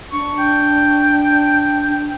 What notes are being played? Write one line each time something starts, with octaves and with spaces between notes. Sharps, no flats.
D4 C#6
G5